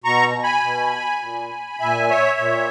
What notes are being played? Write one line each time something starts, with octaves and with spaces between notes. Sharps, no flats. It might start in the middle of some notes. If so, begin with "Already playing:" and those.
B2 A#5 C#6
G#5 B5
B2
A#2
A#2 E5 G#5
C#5 E5
A#2